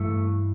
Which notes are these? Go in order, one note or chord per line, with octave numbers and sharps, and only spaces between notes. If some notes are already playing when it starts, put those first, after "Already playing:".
Already playing: G2 E3 A3